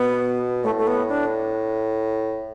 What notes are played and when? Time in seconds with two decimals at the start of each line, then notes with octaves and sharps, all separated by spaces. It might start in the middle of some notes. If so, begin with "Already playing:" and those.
Already playing: B2 B3
0.64 A2 A3
0.78 A3
0.87 B3
1.09 D4